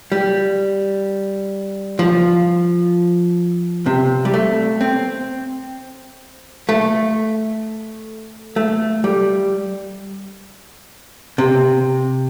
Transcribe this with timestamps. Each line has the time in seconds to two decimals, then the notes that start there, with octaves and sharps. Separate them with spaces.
0.12 G3
1.99 F3
3.86 C3
4.25 G3
4.34 A3
4.81 C4
6.69 A3
8.56 A3
9.04 G3
11.38 C3